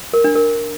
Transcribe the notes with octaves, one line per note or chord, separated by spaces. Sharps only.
A#4
D4
A#4